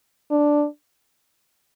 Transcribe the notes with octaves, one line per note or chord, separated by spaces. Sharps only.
D4